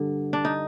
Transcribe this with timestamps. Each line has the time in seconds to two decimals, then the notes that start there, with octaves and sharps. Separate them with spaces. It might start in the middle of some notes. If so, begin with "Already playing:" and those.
Already playing: G2 D3
0.33 D4
0.45 D#4